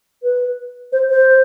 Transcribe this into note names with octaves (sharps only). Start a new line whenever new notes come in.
B4
C5
C5